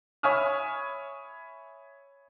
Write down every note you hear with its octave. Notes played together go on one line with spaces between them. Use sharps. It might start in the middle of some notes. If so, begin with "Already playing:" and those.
C#5 E5 G#5 B5 D#6 F6